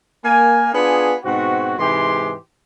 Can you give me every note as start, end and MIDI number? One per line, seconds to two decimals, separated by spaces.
0.25 0.70 58
0.25 0.70 80
0.74 1.14 59
0.74 1.14 62
0.74 1.14 65
0.74 1.14 68
1.24 1.77 44
1.24 1.77 47
1.24 1.77 60
1.24 1.77 66
1.78 2.33 44
1.78 2.33 48
1.78 2.33 52
1.78 2.33 56
1.78 2.33 67
1.78 2.33 84